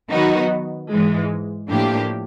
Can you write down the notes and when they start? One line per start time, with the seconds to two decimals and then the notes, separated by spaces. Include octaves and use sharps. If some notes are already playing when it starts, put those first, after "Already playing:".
0.10 D#3 F#3 B3 D#4 F#4
0.90 G#2 E3 G#3
1.69 A2 F3 A#3 D4 G4